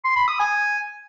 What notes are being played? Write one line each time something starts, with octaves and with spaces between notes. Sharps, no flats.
C6
B5
D#6
G#5